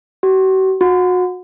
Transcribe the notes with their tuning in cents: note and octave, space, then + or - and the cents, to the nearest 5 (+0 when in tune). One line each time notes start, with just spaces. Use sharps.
F#4 +45
F#4 -30